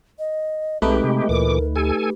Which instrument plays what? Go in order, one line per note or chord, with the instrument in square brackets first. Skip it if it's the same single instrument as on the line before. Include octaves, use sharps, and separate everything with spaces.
[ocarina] D#5
[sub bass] B1 [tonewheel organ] G#3 G4 [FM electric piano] A3 D#4 B4 [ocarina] C4
[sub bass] C3
[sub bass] D2 [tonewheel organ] A#2 E3 D6 [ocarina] A#4
[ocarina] G4 [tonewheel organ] A4 G#5